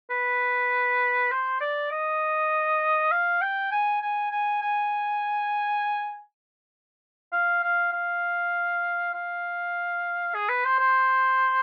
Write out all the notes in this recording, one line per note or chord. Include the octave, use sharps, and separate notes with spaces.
B4
C5
D5
D#5
F5
G5
G#5
G#5
G#5
G#5
F5
F5
F5
F5
G#4
B4
C5
C5